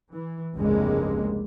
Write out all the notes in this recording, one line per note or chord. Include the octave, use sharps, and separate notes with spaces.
E3
F1 C#2 G2 C3 G#3 A#3